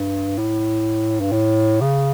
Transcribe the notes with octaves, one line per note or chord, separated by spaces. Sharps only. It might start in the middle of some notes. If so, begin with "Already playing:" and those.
Already playing: G2
A2
G2
A2
C#3